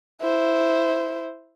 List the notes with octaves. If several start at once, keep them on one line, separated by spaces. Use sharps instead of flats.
E4 C5